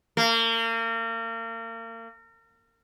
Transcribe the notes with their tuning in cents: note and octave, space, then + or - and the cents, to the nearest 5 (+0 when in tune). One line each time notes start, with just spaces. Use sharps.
A#3 -35